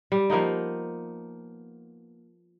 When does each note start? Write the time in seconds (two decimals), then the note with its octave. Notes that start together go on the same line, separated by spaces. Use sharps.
0.12 G3
0.30 F3 A#3 B3 D#4